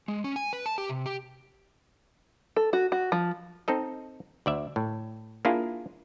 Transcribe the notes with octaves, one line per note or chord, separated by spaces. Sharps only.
G#3
C#4
G#5
B4
A5
G4
C3
G4
A4
F#4
F#4
F3
C4 D#4 A4 D#5
D2 D5 E5
A2
A#3 D4 E4 F4 G#4